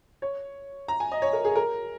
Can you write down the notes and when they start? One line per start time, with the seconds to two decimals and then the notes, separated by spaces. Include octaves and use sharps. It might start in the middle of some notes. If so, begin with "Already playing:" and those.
0.22 C#5
0.88 A#5
1.00 G#5
1.12 D#5
1.22 C#5
1.33 A#4
1.45 G#4
1.56 A#4